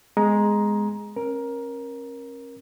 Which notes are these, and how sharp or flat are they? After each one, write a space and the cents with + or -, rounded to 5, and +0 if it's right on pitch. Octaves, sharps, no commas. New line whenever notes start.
G#3 +0 B3 +10 A#5 +15
C#4 -35 A#4 +15